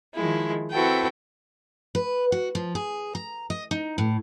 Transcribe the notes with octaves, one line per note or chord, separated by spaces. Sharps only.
D#3 F3 G#3 E4
C4 E4 F#4 A4 B4 G5
B4
F#4
F3
G#4
A#5
D#5
D#4
A2